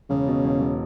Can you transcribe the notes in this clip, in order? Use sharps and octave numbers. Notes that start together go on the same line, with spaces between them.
E1 C#3
B2
E1
E1